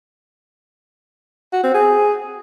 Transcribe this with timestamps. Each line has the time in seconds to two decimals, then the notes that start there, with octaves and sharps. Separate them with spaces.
1.53 F#4
1.63 C4
1.74 G#4